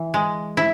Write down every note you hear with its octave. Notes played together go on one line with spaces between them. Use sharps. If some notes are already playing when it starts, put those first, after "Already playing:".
Already playing: E3
G#3
E4